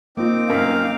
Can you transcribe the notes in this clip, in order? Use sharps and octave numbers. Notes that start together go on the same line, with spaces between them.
A#3 C4 D#4 F4 D6
F#2 A#3 A#4 F5